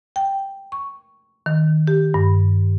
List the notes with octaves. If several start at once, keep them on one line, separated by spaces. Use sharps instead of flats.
G5
C#6
D#3
G4
G2